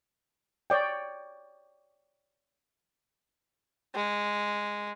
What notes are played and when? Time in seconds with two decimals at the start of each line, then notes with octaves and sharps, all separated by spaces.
0.70 C#5 D5 G5
3.95 G#3